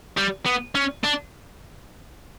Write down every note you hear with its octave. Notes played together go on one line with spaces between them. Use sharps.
G3
B3
C#4
D4